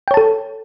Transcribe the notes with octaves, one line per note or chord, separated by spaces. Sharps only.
A4 C#5 G5 A5